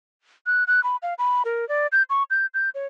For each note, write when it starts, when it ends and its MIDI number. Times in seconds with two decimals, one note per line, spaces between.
0.46 0.64 90
0.67 0.83 90
0.84 0.96 83
1.02 1.14 77
1.18 1.43 83
1.45 1.68 70
1.69 1.87 74
1.92 2.03 91
2.10 2.23 85
2.30 2.46 91
2.54 2.70 91
2.74 2.87 73